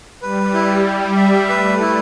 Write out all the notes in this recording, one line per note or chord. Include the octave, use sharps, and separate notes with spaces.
G3 B4
E4
G4
E5
A3 B4
E4